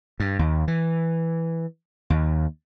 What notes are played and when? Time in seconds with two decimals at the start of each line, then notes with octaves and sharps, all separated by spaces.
0.20 G2
0.39 D#2
0.68 E3
2.10 D#2